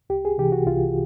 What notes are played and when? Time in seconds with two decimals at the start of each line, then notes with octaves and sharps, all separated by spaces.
0.10 C2 G4
0.25 G#4
0.38 C3 E3 G4
0.52 F#4
0.67 C2 F4